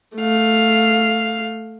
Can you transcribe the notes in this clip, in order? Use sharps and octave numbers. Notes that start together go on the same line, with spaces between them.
A3 F5